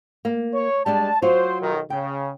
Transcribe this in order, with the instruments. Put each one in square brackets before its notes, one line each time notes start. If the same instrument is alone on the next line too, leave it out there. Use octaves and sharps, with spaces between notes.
[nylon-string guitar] A#3
[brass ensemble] C#5
[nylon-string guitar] G3 G#3 D4 [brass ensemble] A5
[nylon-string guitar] F#3 F4 F#4 [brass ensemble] C5
[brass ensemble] B1 D#3
[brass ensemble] C#3 [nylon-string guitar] G5